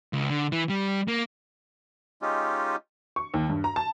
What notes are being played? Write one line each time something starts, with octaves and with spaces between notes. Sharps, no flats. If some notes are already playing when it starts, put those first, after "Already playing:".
C#2
D3
E3
G3
A#3
G#3 C#4 D#4 F4 G4
C#6
D#2
G2
A#5
A5